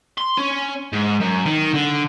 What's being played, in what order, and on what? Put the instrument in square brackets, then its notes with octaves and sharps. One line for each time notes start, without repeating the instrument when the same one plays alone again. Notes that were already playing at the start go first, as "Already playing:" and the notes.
[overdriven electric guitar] C6
C#4
G#2
F#2
D#3
D3